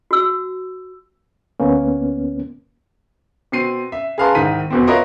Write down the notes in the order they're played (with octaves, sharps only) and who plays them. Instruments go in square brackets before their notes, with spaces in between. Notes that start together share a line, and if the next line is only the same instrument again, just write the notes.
[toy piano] F#4 E6
[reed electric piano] D2 A#3 B3 C#4
[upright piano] B2 C4 C7 D#7
E5
G#4 B4 F5 A5 A#5 C6
C2 G#2 D#3 B6 D#7
E2 B2 C4
F4 A#4 B4 C#5 D#5 E5